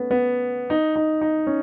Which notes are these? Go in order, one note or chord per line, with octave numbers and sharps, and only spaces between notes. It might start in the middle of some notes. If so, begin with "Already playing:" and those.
Already playing: A3 B3 C#4
B3
D#4
D#4
D#4
C#4